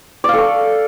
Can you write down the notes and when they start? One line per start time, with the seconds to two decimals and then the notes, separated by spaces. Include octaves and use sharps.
0.24 D5
0.29 F5
0.33 A4
0.38 C#6